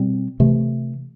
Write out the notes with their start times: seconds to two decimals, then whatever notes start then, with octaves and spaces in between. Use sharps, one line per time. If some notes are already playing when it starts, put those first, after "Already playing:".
Already playing: B2 G3 C4
0.40 C3 E3 A3